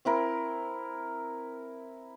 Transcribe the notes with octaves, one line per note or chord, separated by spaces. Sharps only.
C4 E4 A#4